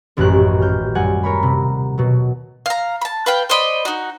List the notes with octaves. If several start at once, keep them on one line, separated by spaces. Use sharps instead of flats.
D#1 A1 F#2 G#3 G4 F#6
F6 G6
F#2 F#3 G3 F#5 G#5
A#4 C#5 B5
C3
B2 F#3
F5 A#5
A5 B5
B4 F5 G5
C5 D5 D#5 B5
D#4 F#4